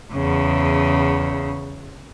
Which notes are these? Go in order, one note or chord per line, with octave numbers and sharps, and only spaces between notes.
E2 C#3